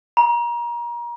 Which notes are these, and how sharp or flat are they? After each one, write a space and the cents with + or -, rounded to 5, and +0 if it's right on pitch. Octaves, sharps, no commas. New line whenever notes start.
A#5 +30